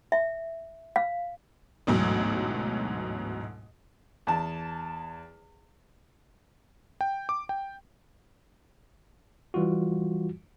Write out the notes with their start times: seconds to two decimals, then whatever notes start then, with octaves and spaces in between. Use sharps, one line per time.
0.12 E5
0.96 F5
1.87 A1 D2 G#2 B2 F#3
4.27 E2 A5
7.01 G5
7.29 D6
7.49 G5
9.54 E3 G3 F4 F#4